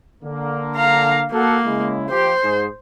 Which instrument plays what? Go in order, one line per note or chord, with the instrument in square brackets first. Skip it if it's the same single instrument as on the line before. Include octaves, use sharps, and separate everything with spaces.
[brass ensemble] D3 A#3
[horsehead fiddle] F5 A#5
[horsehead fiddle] A#3 [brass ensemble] F#4 A4 F#5
[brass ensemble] C#3 G#3 E4
[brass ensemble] F3 G4 [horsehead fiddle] C5
[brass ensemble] G#2 G#4